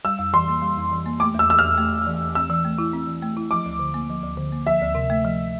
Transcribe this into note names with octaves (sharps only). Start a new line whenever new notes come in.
G3 E6
F2
E3 C6
A#3
G3
F2
E3
A#3
A3 D6
E2 E6
E3 E6
E2 F6
A3
E2
E3
E2
C4 E6
E3
A3
E4
C4
E3
A3
E4
F3 D6
D2
D3
A#3
F3
D2
D3
A#3
F3 E5
D2
C3
A3
F3